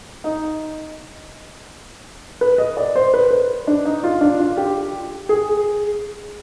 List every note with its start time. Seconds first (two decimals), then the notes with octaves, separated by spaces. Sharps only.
0.24 D#4
2.41 B4
2.58 D#5
2.77 D5
2.95 C5
3.14 B4
3.31 B4
3.67 D4
3.85 D#4
4.04 F4
4.21 D4
4.39 F4
4.57 G4
5.29 G#4